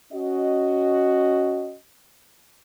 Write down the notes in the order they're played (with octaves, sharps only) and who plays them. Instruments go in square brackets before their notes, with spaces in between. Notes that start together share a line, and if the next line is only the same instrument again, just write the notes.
[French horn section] C#4 F#4 D#5